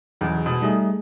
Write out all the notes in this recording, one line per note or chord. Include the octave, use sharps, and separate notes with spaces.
B1 E2 C#3
B2 G#3
G3 A3 D#4 G#4